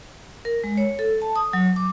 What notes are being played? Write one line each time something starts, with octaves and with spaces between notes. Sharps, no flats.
A#4
G#3
C#5
A4
A5
D#6
F#3
D6